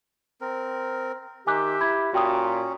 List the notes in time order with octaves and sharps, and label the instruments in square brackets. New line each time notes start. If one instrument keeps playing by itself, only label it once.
[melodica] C4 A#4
[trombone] D#3 [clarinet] G4 [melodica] E5 [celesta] G#5 D6 F#6
[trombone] E4 [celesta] B5 G#6
[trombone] A#2 [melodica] C#4 [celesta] F#4 G5 D#6